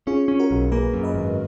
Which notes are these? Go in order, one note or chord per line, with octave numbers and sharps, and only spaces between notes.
C#4 F4 G#4
C#4
F#4 A#4
B1
A#3 G#4 B4
F#2
B4 D#5
G#1